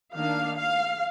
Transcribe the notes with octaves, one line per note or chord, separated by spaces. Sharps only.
D#3 A#3 D4 F5
F5